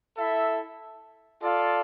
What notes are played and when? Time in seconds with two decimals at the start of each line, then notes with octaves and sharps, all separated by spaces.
0.16 E4 A4 E5
1.41 F4 A4 D5 F5